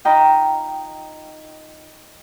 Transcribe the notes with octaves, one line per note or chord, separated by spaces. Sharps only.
D#4 F4 D#5 G5 A#5 B5